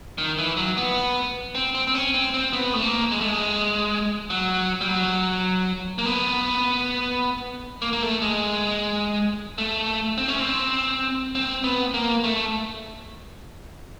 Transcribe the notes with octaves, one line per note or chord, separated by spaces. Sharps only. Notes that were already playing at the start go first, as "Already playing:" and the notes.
D#3
E3
F#3
B3
C4
C4
C4
C#4
C4
C4
B3
A3
A#3
G#3
A3
G#3
F#3
G3
F#3
A#3
B3
A#3
A#3
A3
G#3
A3
C4
C#4
C4
C4
B3
A#3
A3